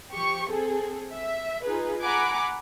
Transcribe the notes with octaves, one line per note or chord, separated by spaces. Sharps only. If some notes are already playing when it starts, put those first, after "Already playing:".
F3 G4 C#6
C4 G#4 A4
E5
D#4 F4 G#4 B4
F#5 G#5 A#5 B5 D6